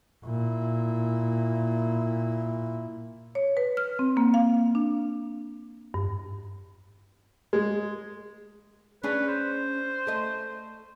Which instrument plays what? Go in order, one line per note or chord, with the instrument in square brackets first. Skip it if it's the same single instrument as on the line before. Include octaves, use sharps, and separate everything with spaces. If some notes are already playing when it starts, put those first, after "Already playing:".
[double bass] A#2 E4
[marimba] C#5
B4
F6
C4
A#3
F5
D4
G2
[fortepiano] G#3
[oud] C#4 D4 G#4 [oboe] B4
[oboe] C5
[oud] A3 D#5